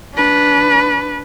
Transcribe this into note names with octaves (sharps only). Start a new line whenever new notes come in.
D4 B4